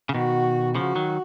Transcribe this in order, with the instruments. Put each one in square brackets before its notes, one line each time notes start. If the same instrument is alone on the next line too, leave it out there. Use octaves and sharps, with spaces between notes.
[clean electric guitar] C#3
[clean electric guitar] B2 D#3 [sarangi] F#4
[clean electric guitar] C#3 F3 [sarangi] F#4
[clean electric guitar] D#3 F#3